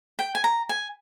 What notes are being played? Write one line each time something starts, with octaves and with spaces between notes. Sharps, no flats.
G5
G#5
A#5
G#5